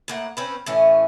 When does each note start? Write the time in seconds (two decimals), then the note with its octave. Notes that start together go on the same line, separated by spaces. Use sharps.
0.08 A2 A#3 F#5
0.37 C4 C#4 B4
0.66 A2 E3 C#4